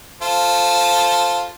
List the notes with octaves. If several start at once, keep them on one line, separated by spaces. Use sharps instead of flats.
F4 A4 C5